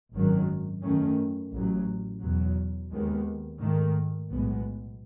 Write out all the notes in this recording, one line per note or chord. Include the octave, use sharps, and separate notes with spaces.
G#1 F#2 D#3 F#3
F#2 D#3 A3 C#4
A1 A2 F#3
E2 B2 F#3
D#2 D#3 G#3 B3
G#2 D#3 A3
B1 A2 G#3 B3